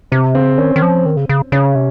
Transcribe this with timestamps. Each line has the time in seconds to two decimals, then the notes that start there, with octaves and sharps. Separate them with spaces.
0.12 C3 C4
0.35 C#3 C4
0.58 D#3 C#4
0.76 D#3
0.82 F3
1.06 D#3
1.17 C#3
1.29 C#3
1.52 C#3 C#4
1.75 C3